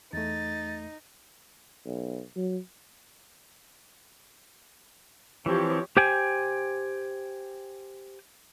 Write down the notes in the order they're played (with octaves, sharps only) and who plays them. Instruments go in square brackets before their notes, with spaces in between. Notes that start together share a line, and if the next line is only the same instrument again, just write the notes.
[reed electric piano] E2 A3 [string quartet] D#4 [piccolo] A6
[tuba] B1
F#3
[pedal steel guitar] E3 C4 [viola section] F3 G4 C#5
[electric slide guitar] G4 C5 G5 G#5